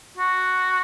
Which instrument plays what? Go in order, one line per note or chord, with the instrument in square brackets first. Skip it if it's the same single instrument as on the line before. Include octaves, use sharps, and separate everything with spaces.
[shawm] F#4